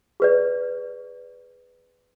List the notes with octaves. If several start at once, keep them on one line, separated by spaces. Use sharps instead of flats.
G#4 B4 D5